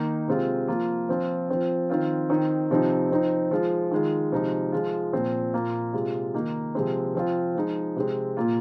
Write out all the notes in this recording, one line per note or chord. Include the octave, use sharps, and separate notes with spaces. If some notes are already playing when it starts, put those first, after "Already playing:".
Already playing: D#3 A#3 D#4
C3 G#3 C4 F4
F3 A#3 F4
F3 C4 F4
F3 C4 F4
D#3 C4 F4
D#3 C4 D#4
C3 F3 C4 D#4
F3 C4 D#4
F3 G#3 F4
D#3 G#3 F4
C3 F3 G#3 D#4
F3 G#3 F4
A#2 F3 C4
A#2 A#3 F4
C3 G#3 F4
D#3 A#3 D#4
C3 F3 G#3 C4
F3 C4 F4
F3 G#3 D#4
C3 G#3 C4
A#2 A#3 F4